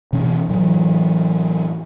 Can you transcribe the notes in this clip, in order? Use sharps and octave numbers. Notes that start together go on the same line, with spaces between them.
B2 E3 C#4
A2 E3 F#3